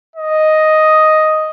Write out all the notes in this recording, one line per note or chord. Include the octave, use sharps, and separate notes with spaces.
D#5